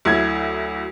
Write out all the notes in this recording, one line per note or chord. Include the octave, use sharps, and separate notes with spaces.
D2 F#3 E4 G#6